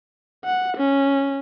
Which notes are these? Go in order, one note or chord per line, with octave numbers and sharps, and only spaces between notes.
F#5
C#4